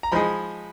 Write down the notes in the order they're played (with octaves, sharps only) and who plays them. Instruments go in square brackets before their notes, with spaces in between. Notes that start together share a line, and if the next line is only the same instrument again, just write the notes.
[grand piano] A#5
[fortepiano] F3 G#3 D#4 G#4 [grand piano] B5